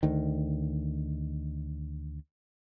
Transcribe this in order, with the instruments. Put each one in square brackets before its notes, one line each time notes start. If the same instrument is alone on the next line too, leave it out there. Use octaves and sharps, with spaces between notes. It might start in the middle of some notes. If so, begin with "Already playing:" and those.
[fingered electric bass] D2 D#3